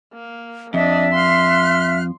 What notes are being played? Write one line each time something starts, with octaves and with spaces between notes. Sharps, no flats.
A#3
F2 D4 D#5 E5
F5 C6 F6 F#6